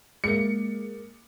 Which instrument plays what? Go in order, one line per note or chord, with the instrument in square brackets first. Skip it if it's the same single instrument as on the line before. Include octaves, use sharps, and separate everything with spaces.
[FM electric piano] G#3 A#3 [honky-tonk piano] C#7